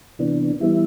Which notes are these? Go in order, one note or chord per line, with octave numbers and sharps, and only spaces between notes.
C3 E3 B3 D4
E3 G3 B3 E4 E5